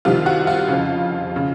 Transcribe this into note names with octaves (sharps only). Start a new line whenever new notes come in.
C2 C3 D#3 F4
F#4
F4
F2 C#3
C#3